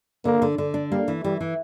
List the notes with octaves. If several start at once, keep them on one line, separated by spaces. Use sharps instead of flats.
D3 A#3
D3
D3
D4
G3 A#3
E3
E3 G3
E3